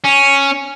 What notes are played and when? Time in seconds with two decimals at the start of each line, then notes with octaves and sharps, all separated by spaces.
0.04 C#4